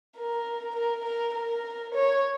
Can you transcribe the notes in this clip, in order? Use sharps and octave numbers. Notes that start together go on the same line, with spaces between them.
A#4
A#4
A#4
A#4
C#5